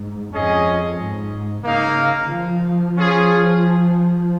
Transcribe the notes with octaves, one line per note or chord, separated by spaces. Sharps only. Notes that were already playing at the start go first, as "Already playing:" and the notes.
Already playing: G#2
F2 C#4 G#4 D#5
G#2
C#3 A#3 D#4 A#4 F5
F3
C#4 F4 G#4